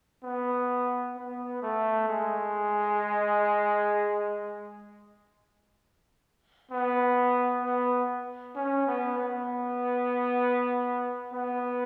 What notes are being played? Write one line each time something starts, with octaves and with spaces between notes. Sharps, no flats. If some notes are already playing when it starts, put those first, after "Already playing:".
B3
B3
A3
G#3
B3
B3
C#4
B3
B3
B3